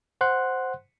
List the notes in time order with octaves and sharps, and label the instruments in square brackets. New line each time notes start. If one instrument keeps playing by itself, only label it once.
[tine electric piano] C5 F#5 C6 F#6